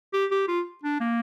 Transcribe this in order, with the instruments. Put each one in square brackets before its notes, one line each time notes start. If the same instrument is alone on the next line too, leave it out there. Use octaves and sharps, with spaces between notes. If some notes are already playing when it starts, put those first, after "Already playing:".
[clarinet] G4
G4
F4
D4
A#3